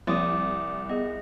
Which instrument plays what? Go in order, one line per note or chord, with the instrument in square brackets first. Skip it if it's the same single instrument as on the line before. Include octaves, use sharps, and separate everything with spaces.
[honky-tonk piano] C2 [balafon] F3 A#3 C6 [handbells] D5 D6 D#6
[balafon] B3 G#4 [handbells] D#5